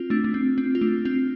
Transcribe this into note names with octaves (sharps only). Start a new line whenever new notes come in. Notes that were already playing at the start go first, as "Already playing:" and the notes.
Already playing: C4 F4
A3 D4
A3
C4
C4
F4
A3 D4
C4 F4